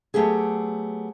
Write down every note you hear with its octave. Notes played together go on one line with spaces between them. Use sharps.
F#3 G3 A3 B3 G4 G#4